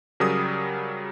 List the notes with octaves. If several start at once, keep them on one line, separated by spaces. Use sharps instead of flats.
C#3 F#3 G3 A#4 D#6